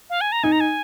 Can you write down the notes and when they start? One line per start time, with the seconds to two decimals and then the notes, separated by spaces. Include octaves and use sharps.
0.10 F5
0.21 G#5
0.32 A#5
0.43 D#4 G#5
0.52 A#5
0.60 G#5